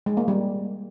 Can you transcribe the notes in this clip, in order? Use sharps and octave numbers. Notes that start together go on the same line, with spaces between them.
G#3
A#3
G3